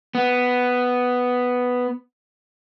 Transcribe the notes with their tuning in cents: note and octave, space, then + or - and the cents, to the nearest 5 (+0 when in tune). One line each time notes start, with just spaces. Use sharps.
B3 +5